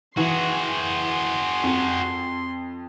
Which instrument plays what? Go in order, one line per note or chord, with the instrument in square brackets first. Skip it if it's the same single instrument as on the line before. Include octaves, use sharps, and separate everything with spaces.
[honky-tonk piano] E3 [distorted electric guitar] F#4 G#4 [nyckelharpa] C6
[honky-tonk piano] F2